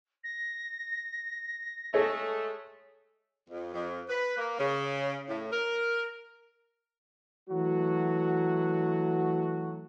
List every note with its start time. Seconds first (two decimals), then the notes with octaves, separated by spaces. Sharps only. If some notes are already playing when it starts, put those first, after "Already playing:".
0.24 A#6
1.94 G#3 A3 G#4 A4 C#5
3.49 F2
3.74 F2
4.09 B4
4.37 A#3
4.59 C#3
5.29 A2
5.52 A#4
7.49 E3 F#3 A3 F#4